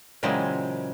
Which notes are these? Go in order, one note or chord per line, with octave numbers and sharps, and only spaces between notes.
A#2 C#3 E3 F#3 G#3 C4